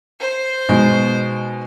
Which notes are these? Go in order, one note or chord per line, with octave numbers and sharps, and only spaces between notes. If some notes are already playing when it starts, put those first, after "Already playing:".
C5
B2 G#3 D#4